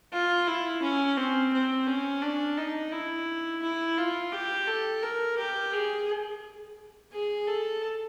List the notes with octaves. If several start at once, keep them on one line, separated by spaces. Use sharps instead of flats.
F4
E4
C#4
C4
C4
C#4
D4
D#4
E4
E4
F4
G4
A4
A#4
G4
G#4
G#4
A4